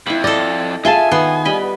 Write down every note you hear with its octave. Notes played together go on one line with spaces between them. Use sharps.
F2 E4 B5
A4 D5 D#5
F4 G#4 E5 G#5 A5 C6
D#3 B3 C6
G3 D#5 B5